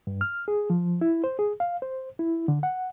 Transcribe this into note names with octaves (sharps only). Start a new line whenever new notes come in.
G2
F6
G#4
F3
E4
C5
G#4
F5
C5
E4
D3
F#5